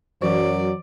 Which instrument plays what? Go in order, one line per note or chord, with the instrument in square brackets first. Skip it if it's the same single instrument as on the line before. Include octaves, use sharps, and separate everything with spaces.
[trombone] F#2 [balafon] E3 [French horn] F#3 [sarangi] D5